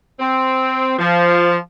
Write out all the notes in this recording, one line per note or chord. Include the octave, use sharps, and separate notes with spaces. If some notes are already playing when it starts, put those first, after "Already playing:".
C4
F3